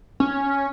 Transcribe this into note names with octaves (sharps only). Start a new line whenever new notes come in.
C#4